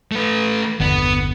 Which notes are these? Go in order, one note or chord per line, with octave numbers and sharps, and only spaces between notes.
A3 B4
G1 E2 D3 B3